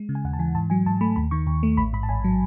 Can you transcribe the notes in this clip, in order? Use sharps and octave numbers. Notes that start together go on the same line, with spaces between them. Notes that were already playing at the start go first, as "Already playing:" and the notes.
Already playing: G#3
C#3
G#5
D#2 F#5
A5
E3 G#5
G#2 A5
F#3 G#5
G#2 A5
A3 B5
D#2 B5
D#3 C#6
D#2
A3
A1 B5
G#2 B5
A5
A1 G#5
F#3